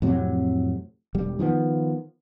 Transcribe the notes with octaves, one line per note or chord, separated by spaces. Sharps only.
F2 A2 C3 F#3
E1 G3
D#3 F3 G3 B3